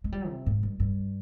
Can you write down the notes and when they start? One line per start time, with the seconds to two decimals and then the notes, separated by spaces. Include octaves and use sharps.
0.04 G#3
0.12 G3
0.29 C3
0.46 G#2
0.63 G2
0.80 G2